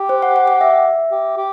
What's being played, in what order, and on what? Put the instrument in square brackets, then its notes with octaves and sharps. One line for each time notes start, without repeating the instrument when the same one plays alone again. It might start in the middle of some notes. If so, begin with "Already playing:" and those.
Already playing: [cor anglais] G4
[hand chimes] C5
F#5
F#5
F#5
E5
[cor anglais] G4
G4